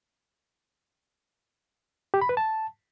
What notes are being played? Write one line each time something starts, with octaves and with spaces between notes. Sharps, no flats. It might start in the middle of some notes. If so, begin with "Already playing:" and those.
G4
B5
B4
A5